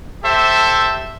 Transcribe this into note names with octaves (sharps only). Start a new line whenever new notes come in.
G4 A4 C5 E5